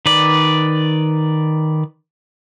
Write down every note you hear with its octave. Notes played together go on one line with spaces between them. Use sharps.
D#3 B4 D5